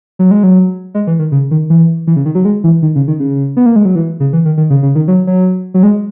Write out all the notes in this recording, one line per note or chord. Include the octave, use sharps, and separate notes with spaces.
F#3
G#3
F#3
G#3
E3
D#3
C#3
D#3
E3
E3
C#3
D#3
F#3
G#3
E3
D#3
C#3
D#3
C#3
B3
A#3
G#3
F#3
E3
C#3
E3
D#3
D#3
C#3
C#3
D#3
F#3
F#3
F#3
G#3